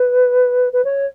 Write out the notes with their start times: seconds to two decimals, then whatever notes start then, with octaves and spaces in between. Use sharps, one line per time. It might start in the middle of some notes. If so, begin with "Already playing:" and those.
Already playing: B4
0.72 B4
0.84 C#5